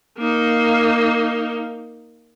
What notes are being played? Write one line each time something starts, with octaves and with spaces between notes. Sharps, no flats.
A#3 D#4